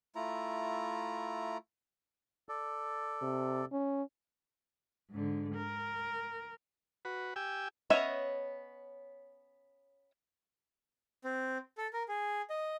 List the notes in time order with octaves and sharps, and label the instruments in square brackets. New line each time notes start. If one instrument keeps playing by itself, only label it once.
[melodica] A3 E4 F4 A#5
[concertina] A4 D5
[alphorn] C3
C#4
[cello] G#2 D3
A#4
[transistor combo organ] F#4 B4
G4 G5 G#5 E6
[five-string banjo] B3 C#4 C#5 D#5 E5
[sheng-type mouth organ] C4
A4
A#4
G#4
D#5